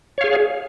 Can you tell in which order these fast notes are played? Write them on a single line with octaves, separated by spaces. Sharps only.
C#5 F5 G#4